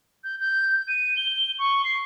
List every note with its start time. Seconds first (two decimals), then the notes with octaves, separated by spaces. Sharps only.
0.24 G6
0.40 G6
0.88 D#7
1.16 G7
1.59 C#6
1.85 C7